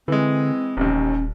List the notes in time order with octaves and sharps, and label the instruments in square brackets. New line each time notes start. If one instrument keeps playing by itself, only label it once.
[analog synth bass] D3 [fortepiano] E3 G#3 [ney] C4
[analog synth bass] D#1 [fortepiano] A1 D#2 [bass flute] C#4